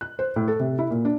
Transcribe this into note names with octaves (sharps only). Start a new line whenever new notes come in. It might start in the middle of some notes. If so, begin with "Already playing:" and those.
F#6
C5
A2
A4
C3
E4
A#2
D4